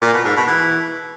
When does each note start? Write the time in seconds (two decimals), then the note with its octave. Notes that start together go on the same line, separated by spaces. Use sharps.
0.02 A#2
0.13 B2
0.25 G#2
0.36 B2
0.48 E3